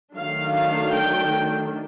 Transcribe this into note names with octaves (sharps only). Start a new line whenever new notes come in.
D#3 F#3 A3 D4 F5
F5
G5